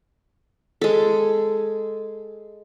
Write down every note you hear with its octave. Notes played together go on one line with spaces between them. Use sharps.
G#3 A4